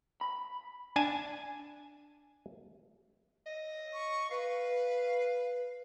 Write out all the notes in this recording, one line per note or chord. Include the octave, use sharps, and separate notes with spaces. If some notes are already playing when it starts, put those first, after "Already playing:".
B5
D4 G#5 A5
D#5
C#6
B4 F5